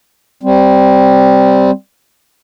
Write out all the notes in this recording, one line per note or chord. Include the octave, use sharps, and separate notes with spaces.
G3 C4